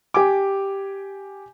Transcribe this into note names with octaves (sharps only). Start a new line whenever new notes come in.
G4 G#5 D6